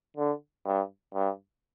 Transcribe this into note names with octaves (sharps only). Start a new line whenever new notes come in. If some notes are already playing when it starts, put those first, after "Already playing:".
D3
G2
G2